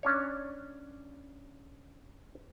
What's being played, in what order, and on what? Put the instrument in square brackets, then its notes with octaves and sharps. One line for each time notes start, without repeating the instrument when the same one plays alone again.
[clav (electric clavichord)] C#4 D4 C#5